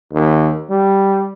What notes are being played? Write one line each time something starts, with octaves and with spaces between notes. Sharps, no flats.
D#2
G3